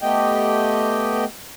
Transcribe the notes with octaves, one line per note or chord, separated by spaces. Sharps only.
A3 B3 G4 D#5 G5